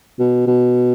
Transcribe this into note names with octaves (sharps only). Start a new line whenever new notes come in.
B2
B2